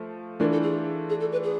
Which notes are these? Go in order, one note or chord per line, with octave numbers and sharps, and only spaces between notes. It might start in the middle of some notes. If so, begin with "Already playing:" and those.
Already playing: F3 A3
E3 A3 D4 F4 A#4
A4
G#4
G#4
A4
B4
G#4